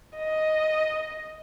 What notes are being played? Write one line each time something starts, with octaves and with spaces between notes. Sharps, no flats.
D#5